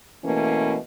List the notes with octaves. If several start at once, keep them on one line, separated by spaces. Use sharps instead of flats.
B2 E3 A3 A#3 C#4